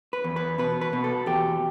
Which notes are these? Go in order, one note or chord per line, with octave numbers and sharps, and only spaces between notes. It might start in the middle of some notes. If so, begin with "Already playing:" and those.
B4
E2
B4
B2 B4
B4
B2
A4
E2 G4